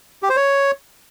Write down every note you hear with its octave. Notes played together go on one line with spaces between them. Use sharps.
G4
C5
C#5